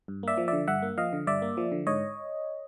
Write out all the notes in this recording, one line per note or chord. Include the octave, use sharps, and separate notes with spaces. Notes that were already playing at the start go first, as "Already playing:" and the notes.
G2
A#3 D5 E5
F3
D3 D5 E5
G2 E5 F#5
A#3
F3 D#5 F5
D3
G2 D5 E5
A#3
F3
D3
G#2 C#5 D#5